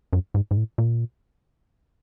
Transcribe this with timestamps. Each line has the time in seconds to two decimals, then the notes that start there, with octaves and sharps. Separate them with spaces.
0.13 F#2
0.34 G#2
0.51 G#2
0.57 A2
0.78 A#2